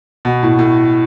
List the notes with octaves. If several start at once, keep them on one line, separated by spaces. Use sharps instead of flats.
B2
A2
A2